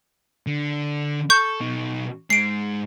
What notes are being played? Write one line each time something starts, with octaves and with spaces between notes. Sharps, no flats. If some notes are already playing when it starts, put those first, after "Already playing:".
D3
A4 C#6 G6
B2 D#4
G#2 G#3 C7 D7